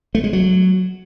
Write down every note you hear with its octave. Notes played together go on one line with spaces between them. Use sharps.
A3
G#3
F#3